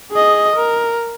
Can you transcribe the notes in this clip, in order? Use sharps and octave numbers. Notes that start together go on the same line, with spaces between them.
G#4 D#5
A#4